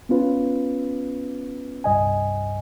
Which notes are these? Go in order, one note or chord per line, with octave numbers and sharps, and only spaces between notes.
B3 C#4 F4 B4
C2 G2 D#5 G#5